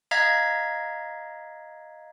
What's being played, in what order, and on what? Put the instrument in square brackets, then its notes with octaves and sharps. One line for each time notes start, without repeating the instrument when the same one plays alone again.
[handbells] D#5 F5 A#5 G#6 B6